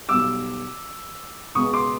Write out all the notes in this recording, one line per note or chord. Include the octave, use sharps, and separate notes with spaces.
B1 B2 G3 D6 E6
C#2 B2 G#3 B3 C#6 D#6
C6 D6